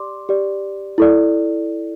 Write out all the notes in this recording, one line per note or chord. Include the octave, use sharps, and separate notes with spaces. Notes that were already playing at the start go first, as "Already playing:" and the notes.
Already playing: G4 D5 C6 D6
G4 D5
E4 A4 D5